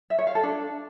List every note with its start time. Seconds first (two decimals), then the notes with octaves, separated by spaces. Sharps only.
0.10 E5
0.19 C#5
0.27 F5
0.35 A4
0.43 D4